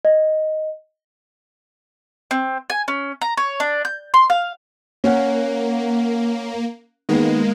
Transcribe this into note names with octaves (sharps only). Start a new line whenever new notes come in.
D#5
C4
G#5
C#4
A#5
C#5
D4
G6
C6
F5
A#3 C#4 F#5
D#3 G#3 A#3 B3